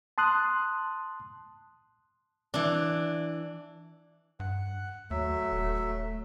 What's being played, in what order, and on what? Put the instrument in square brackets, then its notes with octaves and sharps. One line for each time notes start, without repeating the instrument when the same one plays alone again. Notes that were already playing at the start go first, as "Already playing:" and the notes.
[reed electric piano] A5 C6 D#6 F#6
[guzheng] E3 D4
[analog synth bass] G2 [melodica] F#5
[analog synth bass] D#2 [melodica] F#3 E5 [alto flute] A3
[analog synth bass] D#1